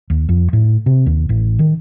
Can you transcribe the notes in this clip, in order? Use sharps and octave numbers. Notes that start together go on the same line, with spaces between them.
D#2
F2
A2
C3
D#2
A1
D#3